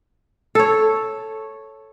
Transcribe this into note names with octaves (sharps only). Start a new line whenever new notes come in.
A4 C#5